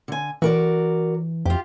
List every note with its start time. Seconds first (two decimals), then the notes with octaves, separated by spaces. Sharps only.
0.08 D3 G#5
0.42 E3 F#4 A#4 D5
1.45 F2 F4 G4